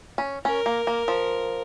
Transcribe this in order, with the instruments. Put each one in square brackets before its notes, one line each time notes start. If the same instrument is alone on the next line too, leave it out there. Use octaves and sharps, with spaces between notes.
[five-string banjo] C#4
[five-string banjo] C#4 [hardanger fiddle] A#4
[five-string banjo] A#3
A#3
F3